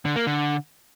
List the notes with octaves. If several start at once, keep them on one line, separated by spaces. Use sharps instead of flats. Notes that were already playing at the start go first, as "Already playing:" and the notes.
D3
A#3
D3